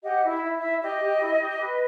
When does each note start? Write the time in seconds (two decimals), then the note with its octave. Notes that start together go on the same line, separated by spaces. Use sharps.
0.04 G4 D#5 F#5
0.24 E4
0.30 E5
0.43 E4
0.57 E5
0.63 E4
0.82 G4 D#5
1.02 G4
1.21 E4
1.40 G4
1.60 B4